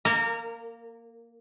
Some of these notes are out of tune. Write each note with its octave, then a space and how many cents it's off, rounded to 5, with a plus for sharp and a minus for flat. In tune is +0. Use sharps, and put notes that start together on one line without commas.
A#3 +0 A#4 -25